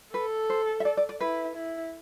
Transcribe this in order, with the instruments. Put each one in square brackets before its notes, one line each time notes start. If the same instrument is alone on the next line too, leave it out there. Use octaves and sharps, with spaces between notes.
[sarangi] A4 [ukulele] B4
[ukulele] C5
E5
D5
D5
D5
[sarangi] E4 [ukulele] B4
[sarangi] E4